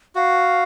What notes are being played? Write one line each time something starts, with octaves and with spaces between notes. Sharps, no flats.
F#4 F5